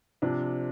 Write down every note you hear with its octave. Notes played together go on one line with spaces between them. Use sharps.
C3 F3 D4